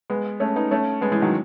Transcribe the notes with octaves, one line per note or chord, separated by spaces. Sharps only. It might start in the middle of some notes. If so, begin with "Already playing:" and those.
G#3 B3
A3 C#4
B3 D#4
A3 C#4
G#3 B3
E3 G#3
D#3 F#3